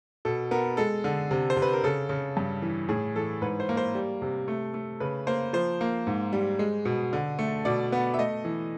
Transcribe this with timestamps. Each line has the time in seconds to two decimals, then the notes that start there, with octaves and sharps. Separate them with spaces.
0.25 B2 A4
0.51 B3 A#4
0.77 G#3 A4
1.04 D3
1.31 C3
1.50 C5
1.56 C3
1.62 B4
1.73 A#4
1.84 C#3 A4
2.09 C#3
2.37 G2
2.62 E3
2.89 A2 G#4
3.16 E3 A4
3.42 G#2 B4
3.60 C5
3.69 A#3
3.77 C5
3.95 G3
4.22 C3
4.48 A3
4.74 A3
5.00 C#3 B4
5.27 A#3 C5
5.53 F3 C5
5.81 A#3
6.07 G#2
6.33 G3
6.59 G#3
6.85 B2
7.13 D3
7.39 A3
7.65 B2 D5
7.92 B3
8.14 E5
8.19 A3 D#5
8.45 E3